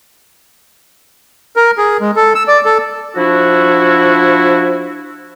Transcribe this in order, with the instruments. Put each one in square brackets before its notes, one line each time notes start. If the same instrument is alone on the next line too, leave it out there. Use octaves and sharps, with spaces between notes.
[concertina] A#4
G#4
G#3
A4
E6
D5
A4
[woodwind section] F3 D4 E4 F#4